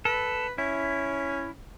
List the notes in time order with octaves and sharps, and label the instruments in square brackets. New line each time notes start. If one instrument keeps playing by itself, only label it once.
[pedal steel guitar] A4 [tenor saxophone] B4
[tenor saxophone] C#4 [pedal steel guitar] E4